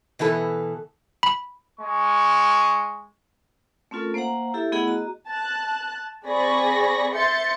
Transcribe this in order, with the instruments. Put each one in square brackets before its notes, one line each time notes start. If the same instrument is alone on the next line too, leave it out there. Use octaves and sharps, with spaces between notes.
[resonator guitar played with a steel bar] B2 E3 B3 A4
[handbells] B5
[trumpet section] G#3 C#6
[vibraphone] A3 C4 C#4 F4 A4 A#4
A#3 C5 F5 F#5 A#5
E4 G4 A4 E5
A3 B3 E4 G#4 D#5 F#5
F#4 D#5 A#5
[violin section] A5 F#6
C4 G#4 D5 B5 C#6 A#6
E5 C6 G6 A6 C#7